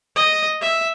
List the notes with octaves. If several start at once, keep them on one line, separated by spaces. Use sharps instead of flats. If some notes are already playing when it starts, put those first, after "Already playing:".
D#5
E5